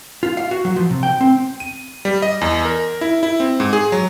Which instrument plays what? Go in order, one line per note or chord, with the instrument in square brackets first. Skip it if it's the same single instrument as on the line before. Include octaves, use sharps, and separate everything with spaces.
[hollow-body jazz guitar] F4
F5
F#4
F#3
F3
C3
G5
C4
[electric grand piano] D#7
G3
D#5
E2
A#4
E4
E4
C4
G#2
G#4
F#3